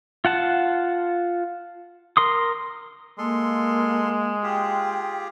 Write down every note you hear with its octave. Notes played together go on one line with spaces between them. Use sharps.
F4 F#5 A5
A#4 C6 D#6
G#3 A#3 A4 C6
F4 G4 G#4 G5